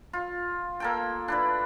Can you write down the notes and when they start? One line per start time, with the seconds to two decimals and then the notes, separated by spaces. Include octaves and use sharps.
0.13 F4
0.80 A#3 A4 G5
1.28 D4 E4 B4